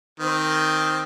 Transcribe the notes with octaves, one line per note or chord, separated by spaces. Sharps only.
D#3 C4